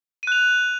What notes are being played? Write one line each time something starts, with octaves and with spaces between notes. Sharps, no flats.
F#6 D#7 F7